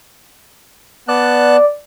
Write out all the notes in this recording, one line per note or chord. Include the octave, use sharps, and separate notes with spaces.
B3 D5 A5 F#6